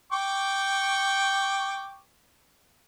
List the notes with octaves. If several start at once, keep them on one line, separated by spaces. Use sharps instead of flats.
G5 C#6 D6